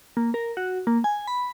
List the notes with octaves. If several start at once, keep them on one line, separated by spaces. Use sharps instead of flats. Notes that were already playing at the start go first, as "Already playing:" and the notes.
A#3
A#4
F#4
A#3
G#5
B5